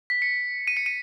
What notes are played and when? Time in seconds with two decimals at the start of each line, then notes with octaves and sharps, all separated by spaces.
0.10 B6
0.22 C#7
0.68 D#7
0.77 C#7
0.86 D#7